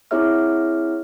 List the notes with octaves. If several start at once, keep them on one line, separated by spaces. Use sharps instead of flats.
C4 E4 G#4 C#5 E5 F6